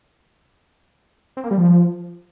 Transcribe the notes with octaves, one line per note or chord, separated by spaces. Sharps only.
C4
A#3
G3
F3